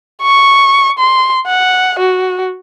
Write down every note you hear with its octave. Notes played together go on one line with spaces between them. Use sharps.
C#6
C6
F#5
F#4